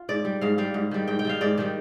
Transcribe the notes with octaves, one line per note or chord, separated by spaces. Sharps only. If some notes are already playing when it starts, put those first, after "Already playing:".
Already playing: F4
G#2 D5
G3
G#2 F5
G3 F5
G#2
D#3 G3
G#2 G5
G5
D#3 G3 F5
G#2 D5
D#3 G3